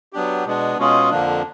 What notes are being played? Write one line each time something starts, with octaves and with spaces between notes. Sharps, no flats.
F#3 B3 D4 G4
B2 G#3 B3 D4
B2 G#3 C#4 F4 G#4
F2 D3 F3 A#3 D4